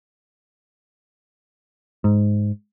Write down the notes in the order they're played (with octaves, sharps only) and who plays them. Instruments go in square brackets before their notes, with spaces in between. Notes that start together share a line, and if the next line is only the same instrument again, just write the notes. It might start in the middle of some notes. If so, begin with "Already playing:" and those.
[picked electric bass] G#2